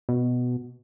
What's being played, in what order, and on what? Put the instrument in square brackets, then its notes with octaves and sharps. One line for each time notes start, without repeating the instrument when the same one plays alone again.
[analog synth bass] B2